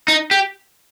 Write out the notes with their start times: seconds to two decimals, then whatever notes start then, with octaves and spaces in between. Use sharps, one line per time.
0.08 D#4
0.31 G4